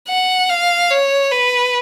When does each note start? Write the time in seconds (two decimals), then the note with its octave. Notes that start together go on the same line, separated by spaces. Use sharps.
0.09 F#5
0.49 F5
0.90 C#5
1.31 B4